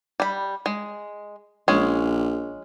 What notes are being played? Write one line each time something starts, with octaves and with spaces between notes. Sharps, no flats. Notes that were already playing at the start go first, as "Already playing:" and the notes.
G3 B5
G#3
A#1 G#3 C#4